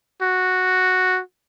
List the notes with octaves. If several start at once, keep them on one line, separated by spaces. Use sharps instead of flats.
F#4